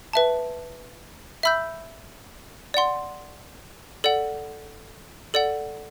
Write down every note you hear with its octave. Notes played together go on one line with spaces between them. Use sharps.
B4 E5 A5
E5 B5 E6 G6
D5 F#5 C6
A4 D5 F#5
A4 D5 F#5